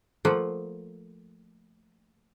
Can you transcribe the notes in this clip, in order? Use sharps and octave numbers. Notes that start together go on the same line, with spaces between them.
F3 A3 A#3 F#5